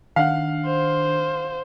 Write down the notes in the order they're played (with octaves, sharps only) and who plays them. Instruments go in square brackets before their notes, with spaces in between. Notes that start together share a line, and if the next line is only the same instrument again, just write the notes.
[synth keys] D#3 D4 [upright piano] F5 F#5
[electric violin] C5